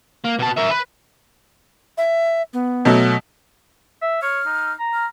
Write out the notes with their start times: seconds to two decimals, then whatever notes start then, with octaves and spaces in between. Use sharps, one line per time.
0.25 A#3
0.39 B2 A5
0.57 A#4 E5
0.71 B4
1.98 E5
2.53 B3
2.85 B2 F#3 A3
4.02 E5
4.22 C#5 F6
4.46 D#4
4.79 A#5
4.94 F6